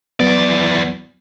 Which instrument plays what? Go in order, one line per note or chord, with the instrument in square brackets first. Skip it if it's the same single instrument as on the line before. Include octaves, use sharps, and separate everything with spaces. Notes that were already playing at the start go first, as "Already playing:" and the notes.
[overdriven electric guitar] E2 D5 [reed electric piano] F#3 B3